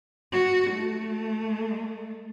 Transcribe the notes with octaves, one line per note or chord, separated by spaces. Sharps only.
F#4
A3